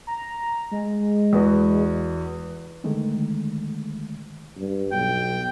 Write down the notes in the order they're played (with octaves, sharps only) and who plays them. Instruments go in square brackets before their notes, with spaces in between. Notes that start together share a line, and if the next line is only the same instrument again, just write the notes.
[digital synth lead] A#5
G#3
[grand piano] E2 B3 F#4
[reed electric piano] D3 D#3 G#3 A3
[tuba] G2
[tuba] B1 [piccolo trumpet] G5